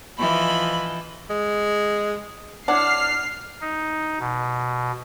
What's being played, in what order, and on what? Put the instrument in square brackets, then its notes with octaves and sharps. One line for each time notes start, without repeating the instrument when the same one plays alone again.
[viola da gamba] E3 F3 D#5 [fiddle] B5
[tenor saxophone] G#3
[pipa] D4 [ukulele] E4 C#5 F#5 [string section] F6 C7
[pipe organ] D#4
B2